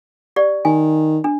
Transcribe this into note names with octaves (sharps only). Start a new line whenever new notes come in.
G4 D5
D#3 G#5
D4